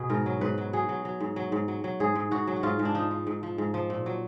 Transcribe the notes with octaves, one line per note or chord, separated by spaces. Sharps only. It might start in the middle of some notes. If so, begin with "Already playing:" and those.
Already playing: B2 G#4
G#2 A#4
F#3
G#2 B4
F#3
F#3 G#4
F#3
F#3
G#2
F#3
G#2
F#3
F#3
G#2 G#4
G#2
G#2 F#4
F#3
F#4
G#2 F4
G#2
D4
F3 D#4
F3
G#2
F3
G#2
F3
A#2
F#3